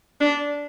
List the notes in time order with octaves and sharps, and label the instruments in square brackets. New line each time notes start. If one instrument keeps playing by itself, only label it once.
[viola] D4